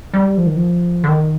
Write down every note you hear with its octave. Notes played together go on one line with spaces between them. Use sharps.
G3
F3
D#3
F3
D3
D#3